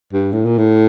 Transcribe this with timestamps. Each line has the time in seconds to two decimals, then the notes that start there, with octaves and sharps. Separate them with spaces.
0.13 G2
0.32 A2
0.45 A#2
0.58 A2